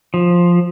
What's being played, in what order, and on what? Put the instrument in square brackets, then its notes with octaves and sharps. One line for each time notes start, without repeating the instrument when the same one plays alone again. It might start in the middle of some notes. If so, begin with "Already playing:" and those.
[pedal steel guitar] F3